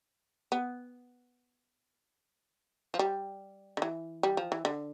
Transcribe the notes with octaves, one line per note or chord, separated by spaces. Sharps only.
B3
F3
G3
D3
E3
G3
F3
E3
D3